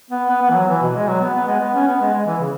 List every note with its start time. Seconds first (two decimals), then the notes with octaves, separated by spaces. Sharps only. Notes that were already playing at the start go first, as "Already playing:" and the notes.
0.11 B3
0.29 B3
0.42 B3
0.50 E3
0.55 F#3
0.69 E3
0.82 B2
0.96 G#3
1.08 F#3
1.21 B3
1.35 B3
1.48 G#3
1.61 B3
1.75 C#4
1.88 B3
2.01 G#3
2.14 G#3
2.26 E3
2.41 C#3